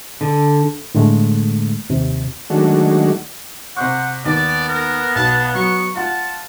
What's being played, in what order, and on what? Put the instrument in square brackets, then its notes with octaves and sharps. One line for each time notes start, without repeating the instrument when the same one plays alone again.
[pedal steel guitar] D3
[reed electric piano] A2 D3 G#3 A3
D#2 C3
[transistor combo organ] D#3 F#3 G#3 A3 D4 F#4
[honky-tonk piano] C3 C#6 [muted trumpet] C5 [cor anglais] F#5
[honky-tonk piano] D#2 [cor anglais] B3 [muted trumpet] D5
[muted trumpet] A#4
[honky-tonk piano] B1 [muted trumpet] A5
[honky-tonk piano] F#3 [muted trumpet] C#6
[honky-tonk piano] F4 F#5 [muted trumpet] A5